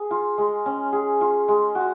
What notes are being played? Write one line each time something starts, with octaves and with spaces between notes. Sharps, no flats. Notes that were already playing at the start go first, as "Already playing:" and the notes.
Already playing: G#4
F4
G#3
C#4
G#4
F4
G#3
F#4